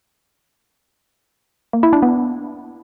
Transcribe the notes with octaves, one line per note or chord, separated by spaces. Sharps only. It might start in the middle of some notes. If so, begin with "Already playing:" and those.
A#3
E4
D4
B3